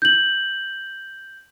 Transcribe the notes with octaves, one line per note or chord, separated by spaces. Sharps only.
G6 F#7